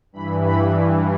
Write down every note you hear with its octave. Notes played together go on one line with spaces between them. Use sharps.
G2 E3 B5
B5